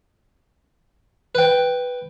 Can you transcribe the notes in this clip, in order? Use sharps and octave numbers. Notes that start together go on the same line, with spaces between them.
B4 G5